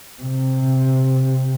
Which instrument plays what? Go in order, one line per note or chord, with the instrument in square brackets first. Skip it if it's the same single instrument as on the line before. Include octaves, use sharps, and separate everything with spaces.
[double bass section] C3